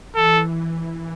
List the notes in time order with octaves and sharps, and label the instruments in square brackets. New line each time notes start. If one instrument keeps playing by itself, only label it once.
[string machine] E3 [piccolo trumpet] A4